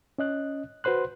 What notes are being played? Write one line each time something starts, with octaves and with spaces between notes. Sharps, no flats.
C#4 D#5 F#6
F#4 B4 C5 C6 F#6